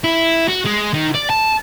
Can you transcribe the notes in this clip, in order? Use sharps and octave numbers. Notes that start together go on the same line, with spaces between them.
E4
F#4
G#3
D#3
D5
A5